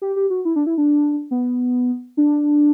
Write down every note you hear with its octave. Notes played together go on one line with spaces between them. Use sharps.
G4
G4
F#4
E4
D4
E4
D4
B3
D4